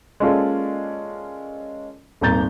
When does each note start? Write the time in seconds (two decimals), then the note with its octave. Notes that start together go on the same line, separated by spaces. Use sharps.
0.20 G#3 A#3 C#4 F4 A4 D5
2.21 D#1 G#1 A#3 A#5 G6 A6